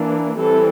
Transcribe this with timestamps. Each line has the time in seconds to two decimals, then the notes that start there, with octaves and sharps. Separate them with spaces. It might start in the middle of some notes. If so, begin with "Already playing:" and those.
Already playing: E3 A#3 D4
0.39 E3 G3 C4 A4